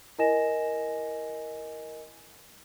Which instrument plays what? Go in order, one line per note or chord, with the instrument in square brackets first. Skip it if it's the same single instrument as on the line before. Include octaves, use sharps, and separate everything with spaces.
[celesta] E4 A#4 D#5 G#5 A#6 E7